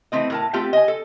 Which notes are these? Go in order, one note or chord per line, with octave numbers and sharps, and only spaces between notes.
E3 A3 C4 D#5
A2 A#4 A5
A3 C4 F4 G4 E5 G5
D#5 G#5
A4